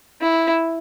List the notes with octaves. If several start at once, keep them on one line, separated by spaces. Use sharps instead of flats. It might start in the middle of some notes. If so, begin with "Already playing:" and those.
E4